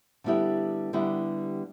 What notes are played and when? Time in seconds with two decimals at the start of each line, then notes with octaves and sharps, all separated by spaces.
0.24 D3 G3 B3 E4 G4
0.93 D3 G3 B3 E4 G4